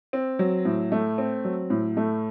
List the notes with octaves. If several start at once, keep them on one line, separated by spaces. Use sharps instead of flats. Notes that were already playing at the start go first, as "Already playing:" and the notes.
C4
F#3
A2
A3
C4
F#3
A2
A3